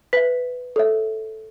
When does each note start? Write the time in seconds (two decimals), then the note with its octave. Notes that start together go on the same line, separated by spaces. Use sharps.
0.13 B4 E5 B6
0.76 A4 C#5 E5